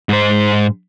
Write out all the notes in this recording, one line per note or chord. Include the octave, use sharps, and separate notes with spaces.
G#2 C5